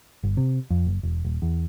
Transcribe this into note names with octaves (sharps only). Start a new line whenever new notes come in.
G1
C3
F2
F#1
E1
D#1
E2